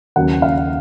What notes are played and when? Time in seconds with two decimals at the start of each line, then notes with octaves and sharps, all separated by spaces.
0.16 D#2 C#3 F#3 A#3 F#5
0.42 F5